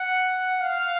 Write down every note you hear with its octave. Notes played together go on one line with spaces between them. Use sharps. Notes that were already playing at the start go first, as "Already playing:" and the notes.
Already playing: F#5
F5